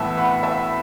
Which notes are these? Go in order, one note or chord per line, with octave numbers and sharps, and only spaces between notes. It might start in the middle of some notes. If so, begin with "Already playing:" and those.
Already playing: A2 E3 B3 E5 A5
F#5 B5
E5 A5